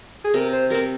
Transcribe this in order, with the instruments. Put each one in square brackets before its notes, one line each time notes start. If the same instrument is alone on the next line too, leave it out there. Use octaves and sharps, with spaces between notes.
[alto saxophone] G#4
[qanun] C3 [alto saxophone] A#4
[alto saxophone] C5
[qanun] G3 C4 [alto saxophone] A#4